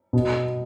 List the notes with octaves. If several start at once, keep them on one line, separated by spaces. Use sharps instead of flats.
B2